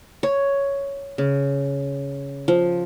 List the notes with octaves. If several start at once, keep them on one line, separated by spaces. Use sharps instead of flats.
C#5
C#3
F3